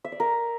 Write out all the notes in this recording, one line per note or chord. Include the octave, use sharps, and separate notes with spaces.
E5
D5
A#4